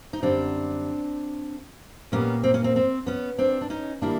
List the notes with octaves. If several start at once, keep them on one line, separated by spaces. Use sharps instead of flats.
D#4
F#2 D3 G3 C4 D4
A#2 G3 A#3 B3 C#4
C4
C#4
C4
C4
B3 C#4
C4 D4
D4
C#4 D#4
D#3 G3 A#3 D4 E4